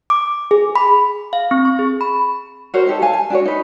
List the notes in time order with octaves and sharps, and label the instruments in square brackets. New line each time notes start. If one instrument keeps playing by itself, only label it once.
[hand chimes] D6
G#4
B5
[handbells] F5
C4
C#6
G#4
B5
[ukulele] F#4 A#4 C5 C#5
D#4 G4 A4
F5 G#5 A5
G#5
D4 F#4 B4 C#5
D#4 B4